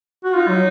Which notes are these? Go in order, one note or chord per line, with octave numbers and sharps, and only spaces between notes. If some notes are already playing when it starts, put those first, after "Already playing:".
F#4
D#4 F4
F#3